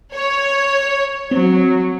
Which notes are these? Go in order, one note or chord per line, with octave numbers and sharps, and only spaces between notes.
C#5
F#3 C4